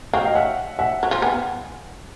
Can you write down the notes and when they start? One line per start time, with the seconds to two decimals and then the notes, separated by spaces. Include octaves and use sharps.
0.13 F#3 F5 G5
0.24 D#5 F5
0.35 E5 F#5
0.79 E5 F#5
1.03 F#3
1.11 F3 F5 G5
1.22 B3 F#5 G#5